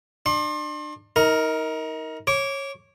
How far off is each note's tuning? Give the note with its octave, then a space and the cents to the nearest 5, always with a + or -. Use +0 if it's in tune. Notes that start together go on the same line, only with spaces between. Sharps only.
D4 +35 C6 +35
D#4 +30 A#4 +0
C#5 -15 D6 -20